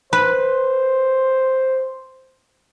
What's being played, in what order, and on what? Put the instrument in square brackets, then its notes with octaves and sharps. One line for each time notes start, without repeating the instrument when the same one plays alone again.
[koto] B4 [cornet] C5